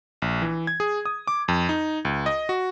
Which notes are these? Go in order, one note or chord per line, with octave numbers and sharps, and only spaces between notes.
A#1
E3
G#6
G#4
D#6
D6
F2
D#4
C#2
D#5
F#4